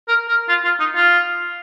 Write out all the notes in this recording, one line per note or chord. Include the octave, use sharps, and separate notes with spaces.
A#4
A#4
F4
F4
D#4
F4